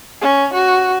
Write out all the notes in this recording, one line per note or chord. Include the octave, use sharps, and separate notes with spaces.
C#4
F#4